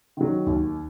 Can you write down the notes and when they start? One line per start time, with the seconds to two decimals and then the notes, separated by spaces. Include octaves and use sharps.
0.17 D#3 F#3
0.46 D#2